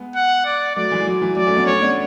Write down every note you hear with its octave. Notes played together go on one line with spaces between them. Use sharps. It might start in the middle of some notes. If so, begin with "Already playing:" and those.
Already playing: G#3 B3
F#5
D5
F#3 A3 D5
E3 G#3
F#3
E3
F#3 D5
A3 C#4
B3 D4
A3 C#4 C#5
B3 D4